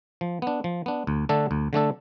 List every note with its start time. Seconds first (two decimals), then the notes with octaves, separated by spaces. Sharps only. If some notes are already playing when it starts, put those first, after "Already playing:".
0.21 F3
0.42 B3 D4
0.64 F3
0.86 B3 D4
1.07 D2
1.29 D3 A3 D4 A4
1.51 D2
1.73 D3 A3 D4 A4